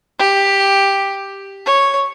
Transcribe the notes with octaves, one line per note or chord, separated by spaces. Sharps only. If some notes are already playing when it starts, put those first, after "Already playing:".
G4
C#5